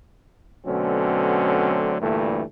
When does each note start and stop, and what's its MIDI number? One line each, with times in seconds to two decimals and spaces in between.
0.65 1.95 47
0.65 1.95 50
0.65 1.95 54
0.65 1.95 57
0.65 1.95 60
0.65 1.95 61
2.00 2.41 38
2.00 2.41 43
2.00 2.41 46
2.00 2.41 52
2.00 2.41 57